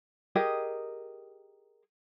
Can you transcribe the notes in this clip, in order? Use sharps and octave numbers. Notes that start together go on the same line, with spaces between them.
G4 G#4 A#4 D#5